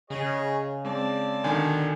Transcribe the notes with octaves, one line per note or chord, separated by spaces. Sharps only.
C#3 G#4 C#5 D#5
G#3 C4 D5 A5
B1 D3 D#3 G#5